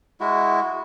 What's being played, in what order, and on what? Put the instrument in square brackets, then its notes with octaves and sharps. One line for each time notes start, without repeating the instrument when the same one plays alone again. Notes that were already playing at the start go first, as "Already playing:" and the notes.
[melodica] G#3 E4 F#4